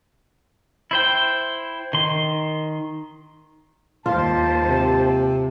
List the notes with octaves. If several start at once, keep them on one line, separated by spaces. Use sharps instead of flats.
E4 C5 G5
D#3 C6
D#2 G#2 F4 C5 A5
C3